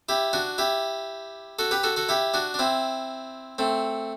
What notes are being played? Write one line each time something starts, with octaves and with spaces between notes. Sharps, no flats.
E4 G4
D4 F#4
E4 G4
F#4 A4
G4 B4
F#4 A4
F#4 A4
E4 G4
D4 F#4
D4
C4 E4
A3 C4